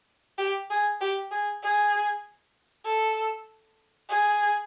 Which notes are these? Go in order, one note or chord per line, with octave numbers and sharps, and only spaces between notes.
G4
G#4
G4
G#4
G#4
A4
G#4